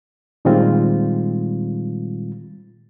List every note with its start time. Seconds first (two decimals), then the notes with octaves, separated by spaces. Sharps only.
0.45 A#2 D#3 G3 G#3 C4 F4